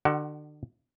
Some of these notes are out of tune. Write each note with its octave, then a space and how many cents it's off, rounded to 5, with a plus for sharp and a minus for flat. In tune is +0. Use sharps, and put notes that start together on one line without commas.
D3 +35 F#4 +45 F#5 +0